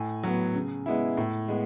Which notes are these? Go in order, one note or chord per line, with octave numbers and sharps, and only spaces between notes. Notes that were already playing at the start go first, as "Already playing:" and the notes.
Already playing: A2 G#5
F#3 B3
C#3
G#3 B3 E4
A2
G#3 B3